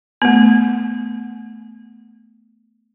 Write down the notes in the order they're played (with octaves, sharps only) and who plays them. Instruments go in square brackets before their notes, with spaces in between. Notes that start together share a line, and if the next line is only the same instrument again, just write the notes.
[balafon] A3 B3